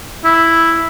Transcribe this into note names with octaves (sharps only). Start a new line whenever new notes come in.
E4